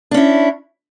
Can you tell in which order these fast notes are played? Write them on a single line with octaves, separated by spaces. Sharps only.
D4 C#4 E4